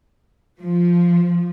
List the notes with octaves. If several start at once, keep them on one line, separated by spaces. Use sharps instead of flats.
F3